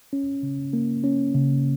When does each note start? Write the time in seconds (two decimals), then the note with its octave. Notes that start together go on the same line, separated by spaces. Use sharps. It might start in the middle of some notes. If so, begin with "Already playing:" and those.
0.13 C#4
0.43 C#3
0.73 A#3
1.04 C#4
1.35 C#3